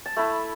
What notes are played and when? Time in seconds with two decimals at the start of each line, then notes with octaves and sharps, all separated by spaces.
0.06 A5
0.17 A3 E4 B5